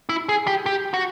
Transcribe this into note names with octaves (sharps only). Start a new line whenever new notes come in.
E4
G#4
G4
G4
F#4